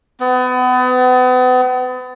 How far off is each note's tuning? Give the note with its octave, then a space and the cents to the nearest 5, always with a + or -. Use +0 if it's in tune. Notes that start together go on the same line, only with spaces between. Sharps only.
B3 +35